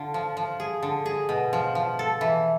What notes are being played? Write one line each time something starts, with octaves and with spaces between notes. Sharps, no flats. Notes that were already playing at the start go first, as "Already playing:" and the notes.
Already playing: D3 F4
F3
F3
G#4
D3
G#4
B2
F3
F3
A4
E3